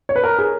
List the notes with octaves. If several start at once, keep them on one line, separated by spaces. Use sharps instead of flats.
C#5
B4
A#4
G#4